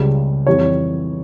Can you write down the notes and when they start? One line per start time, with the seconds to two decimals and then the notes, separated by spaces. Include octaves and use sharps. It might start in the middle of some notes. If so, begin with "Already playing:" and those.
Already playing: C#2 C#3 G3
0.47 F2 E3 G3 C#5